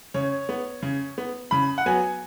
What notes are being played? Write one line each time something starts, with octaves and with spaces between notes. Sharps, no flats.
C#3 C#5
B3
C#3
B3
C#3 B5
F#5
F#3 B3 G#5